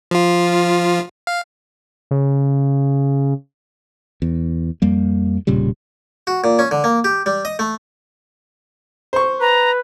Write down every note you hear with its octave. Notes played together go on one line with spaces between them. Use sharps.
F3 F4
F5
C#3
E2
F2 G3 A#3
E1 A#2 C#3 G3
F#4
A#2
C#4
D3
A#3
G4
G3
D#5
A3
C5 C#6
B4 A#5